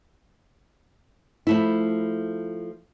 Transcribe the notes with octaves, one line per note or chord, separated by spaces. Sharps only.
F3 A3 E4